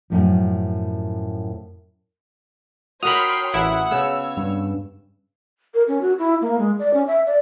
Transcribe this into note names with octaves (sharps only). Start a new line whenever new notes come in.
F#2 A2 F3
F#4 A#4 C#5 G5 B5 C6 D#6 F6
A1 E4 F#5
C#3 B3 C#5 E6
G2
A#4
C#4
F#4
E4
A#3
G#3
D5
C#4
E5
D5